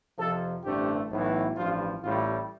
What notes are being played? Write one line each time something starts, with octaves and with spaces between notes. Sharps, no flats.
F2 C3 F3 A4
A1 G2 D3 A3 C4 G4
B1 A2 E3 B3
A1 G2 F3 F4
A1 A2 G3 F4